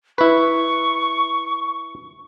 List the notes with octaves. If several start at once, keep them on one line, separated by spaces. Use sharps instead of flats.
E4 B4 C#6